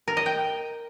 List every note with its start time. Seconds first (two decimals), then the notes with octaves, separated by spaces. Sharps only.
0.08 A#4
0.17 D#5
0.26 G5